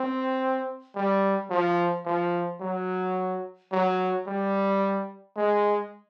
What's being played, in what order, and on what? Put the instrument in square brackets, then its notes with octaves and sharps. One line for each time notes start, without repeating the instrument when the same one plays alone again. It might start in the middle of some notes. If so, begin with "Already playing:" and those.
Already playing: [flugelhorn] C4
G3
F3
F3
F#3
F#3
G3
G#3